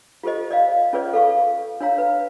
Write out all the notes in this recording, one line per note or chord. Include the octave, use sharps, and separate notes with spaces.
F4 G4 A4 C5 D#5
D5 D#5 F5
C#4 F4 G#4 B4 C#5 D5
A4 F5 C#6
D4 C#5 F5 A#5
B4